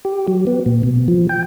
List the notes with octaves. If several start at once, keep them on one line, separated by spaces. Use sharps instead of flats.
G4
F#3
B3
A#2
B2
F3
G5